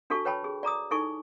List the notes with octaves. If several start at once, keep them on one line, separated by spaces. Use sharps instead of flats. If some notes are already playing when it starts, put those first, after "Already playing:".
D4 F#4 A4 A5 C#6
B4 C#5 G5 A5 B5
G#4
D5 A#5 D6 D#6
D#4 E4 A4 G#5 A5 C#6